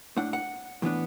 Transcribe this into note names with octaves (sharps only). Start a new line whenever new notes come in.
A2 A3 D4 F#5
F#5
A2 E3 B3 D4